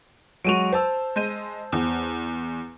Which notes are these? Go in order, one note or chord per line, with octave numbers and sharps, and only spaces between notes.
F#3 G#3 F#4 D7 D#7 F7
C5 A5 E6
G#3 G6 D#7
E2